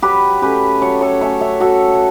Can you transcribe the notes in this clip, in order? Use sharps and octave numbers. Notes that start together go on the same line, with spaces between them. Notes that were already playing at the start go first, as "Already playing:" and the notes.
F#3 G4 B4
A3 C#4 G4 B4
F#3 A4 C#5
A4 C#5
A3 C#4 C#5 E5
C#5 E5
F#3 F#4 A4